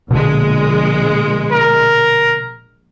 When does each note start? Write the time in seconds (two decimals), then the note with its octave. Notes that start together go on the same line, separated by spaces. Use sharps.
0.11 A#1 B2 D3 G#3
1.52 A#4